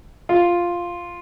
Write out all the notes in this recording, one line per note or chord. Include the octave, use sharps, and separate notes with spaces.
F4